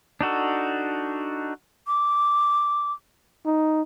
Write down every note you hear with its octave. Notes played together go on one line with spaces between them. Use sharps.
D4 D#4 F#4 A4
D6
D#4